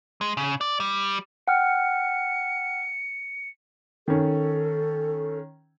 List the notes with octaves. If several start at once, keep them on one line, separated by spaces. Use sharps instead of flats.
G#3
C#3
D5
G3
F#5 G5 F6 C#7
D#3 C#4 A4